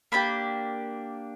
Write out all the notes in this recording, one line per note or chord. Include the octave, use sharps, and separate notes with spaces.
A#3 D4 G4 B5